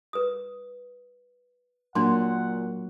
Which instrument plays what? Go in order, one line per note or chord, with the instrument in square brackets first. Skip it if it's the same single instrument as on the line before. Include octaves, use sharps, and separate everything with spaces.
[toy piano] B4 D#6
[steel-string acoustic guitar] A#2 [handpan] F#3 A#3 F#4 [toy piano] D4 C6 [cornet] F#5